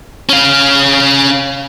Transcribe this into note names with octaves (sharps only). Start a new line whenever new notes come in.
C#4 F5